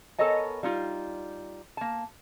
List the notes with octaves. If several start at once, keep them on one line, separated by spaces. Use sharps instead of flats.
B3 A4 A#4 C#5 D#5 G#5
G3 D#4 F4
A#3 A5